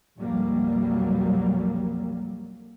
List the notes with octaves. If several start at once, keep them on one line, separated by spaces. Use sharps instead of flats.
B1 F2 F#3 G3 A#3